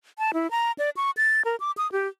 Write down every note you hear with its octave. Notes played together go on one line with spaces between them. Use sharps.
A5
E4
A#5
D5
C#6
A6
A#4
D6
D#6
G4